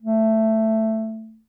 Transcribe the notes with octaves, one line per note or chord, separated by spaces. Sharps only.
A3